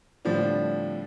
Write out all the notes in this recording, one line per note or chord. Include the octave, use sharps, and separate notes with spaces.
A2 D3 F3 G3 C4 D4